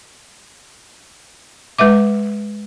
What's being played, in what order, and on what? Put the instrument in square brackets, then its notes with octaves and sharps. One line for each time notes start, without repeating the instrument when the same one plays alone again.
[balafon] G#3 B4 E5 D6